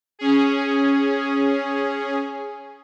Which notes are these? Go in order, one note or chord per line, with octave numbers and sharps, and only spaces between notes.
C#4 G#4